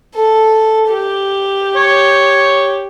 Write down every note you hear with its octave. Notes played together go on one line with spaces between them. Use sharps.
A4
G4
C#5